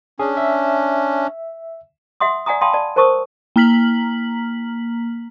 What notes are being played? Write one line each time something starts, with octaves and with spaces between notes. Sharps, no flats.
C#4 D4 G#4
E5
E5 F#5 C6 D#6
D5 F#5 G#5 A#5 D#6
F5 G5 A5 B5 C6 D#6
D5 A5
A#4 C5 A5 C#6 D#6 E6
A#3 A#5 F6 B6 F#7